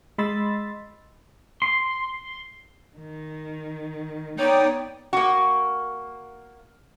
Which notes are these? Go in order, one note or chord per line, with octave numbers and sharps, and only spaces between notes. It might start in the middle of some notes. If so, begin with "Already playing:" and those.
G#3 D#5 B5 C6 E6 A6
C6
D#3
B3 D#4 C#5 D5 G5 D#6
A#3 F#4